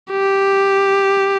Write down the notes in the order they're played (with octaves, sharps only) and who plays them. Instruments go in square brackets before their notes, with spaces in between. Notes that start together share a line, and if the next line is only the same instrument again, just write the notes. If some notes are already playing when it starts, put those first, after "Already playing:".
[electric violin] G4